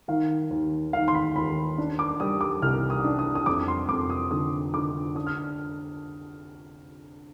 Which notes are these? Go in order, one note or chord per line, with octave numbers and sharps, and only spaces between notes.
D#3 F5
D#2
D#3 F5
C6
B5
D#2 B5
D4
D6
G3 D#6
D6
C2 F6
D#6
D4
D#6
D#6
F2 D6
C6
F2 D6
D#6
D3 D#6
D3 D6
D4 D#6
F6